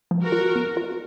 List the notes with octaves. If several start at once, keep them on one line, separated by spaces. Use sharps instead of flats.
F3
F#4 A#4
F4
B3
F4